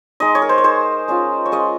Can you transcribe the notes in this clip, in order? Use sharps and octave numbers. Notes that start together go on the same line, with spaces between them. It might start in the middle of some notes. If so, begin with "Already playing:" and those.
G#3 D#4 D#5
C#5
A#4
C5
C#5
G#3 D#4 C5
G#3 C#4 F4
C#5
G#3 C#4 F4 D#5